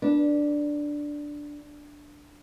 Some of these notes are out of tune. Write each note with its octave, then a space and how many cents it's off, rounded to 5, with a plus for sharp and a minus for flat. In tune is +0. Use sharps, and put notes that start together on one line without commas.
D4 +0 B4 -25